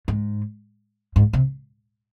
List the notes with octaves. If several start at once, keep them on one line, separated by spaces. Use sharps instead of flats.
G#2
G#2
C3